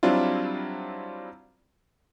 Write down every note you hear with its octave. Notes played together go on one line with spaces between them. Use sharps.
F#3 G3 C4 D4 E4 F4